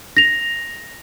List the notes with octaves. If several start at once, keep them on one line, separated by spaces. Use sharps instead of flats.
A#6 F7